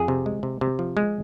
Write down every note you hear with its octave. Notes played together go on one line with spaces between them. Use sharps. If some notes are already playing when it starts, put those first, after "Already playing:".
Already playing: F2 G#4
C3
G#3
C3
C3
F3
G#3